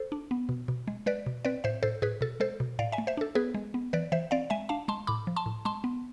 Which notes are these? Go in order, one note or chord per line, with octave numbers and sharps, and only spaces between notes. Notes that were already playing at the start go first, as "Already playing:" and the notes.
Already playing: A4 C5
D4
B3
B2
B2
G#3
G#3 B4 D5
B2
C4 B4 D5
A2 C5 E5
A2 A4 C5
A2 G#4 B4
B2 A4
G#3 A4 C5
B2
A2 D5 F5
E5 G#5
A3
C5 E5
D4 A4
B3 G#4 B4
G#3
B3
E3 B4 D5
E3 C5 E5
C4 D5 F5
G#3 E5 G#5
D4 F5 A5
G#3 A5 C6
A2 B5 D6
F3
A5 C6
A2
G#3 A5 C6
B3